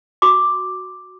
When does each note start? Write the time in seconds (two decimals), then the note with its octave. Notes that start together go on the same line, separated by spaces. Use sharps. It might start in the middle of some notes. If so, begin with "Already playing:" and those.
0.22 F#4 C6 D6